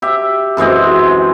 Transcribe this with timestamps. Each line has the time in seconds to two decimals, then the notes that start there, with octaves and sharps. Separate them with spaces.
0.02 G4 E5
0.57 F#2 E3 G#3 C4